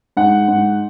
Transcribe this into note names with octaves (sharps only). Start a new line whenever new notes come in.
G#2 F#5
G#2